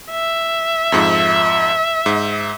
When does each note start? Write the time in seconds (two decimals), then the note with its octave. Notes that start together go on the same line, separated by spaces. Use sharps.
0.11 E5
0.92 F2 G#2 F3
2.06 G#2